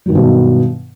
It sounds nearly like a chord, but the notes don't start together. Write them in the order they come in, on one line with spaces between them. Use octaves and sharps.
F#3 D#3 G2 B2